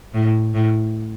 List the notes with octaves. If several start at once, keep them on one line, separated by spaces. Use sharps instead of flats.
A2
A2